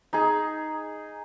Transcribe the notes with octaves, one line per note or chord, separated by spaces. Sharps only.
D#4 G#4